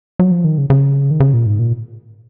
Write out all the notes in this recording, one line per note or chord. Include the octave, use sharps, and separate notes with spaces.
F#3
F3
D#3
C#3
C#3
D#3
C#3
A#2
G#2
A#2